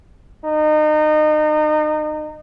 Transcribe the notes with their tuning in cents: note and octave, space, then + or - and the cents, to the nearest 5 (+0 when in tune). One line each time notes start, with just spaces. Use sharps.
D#4 -30